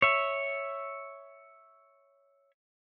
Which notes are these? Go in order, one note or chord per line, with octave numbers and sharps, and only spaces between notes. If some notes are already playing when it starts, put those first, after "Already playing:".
C#5 E5